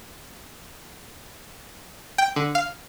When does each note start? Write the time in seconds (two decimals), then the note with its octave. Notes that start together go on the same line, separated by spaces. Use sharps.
2.18 G5
2.36 D3
2.55 F5